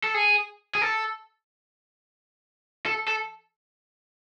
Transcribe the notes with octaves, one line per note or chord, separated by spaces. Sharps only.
A4
G#4
G#4
A4
A4
A4